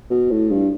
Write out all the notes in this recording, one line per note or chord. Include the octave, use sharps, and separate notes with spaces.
B2
A2
G2